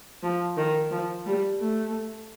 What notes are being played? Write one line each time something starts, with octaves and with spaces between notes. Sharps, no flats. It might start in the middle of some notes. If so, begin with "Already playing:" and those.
F3
D#3
F3
G3
A3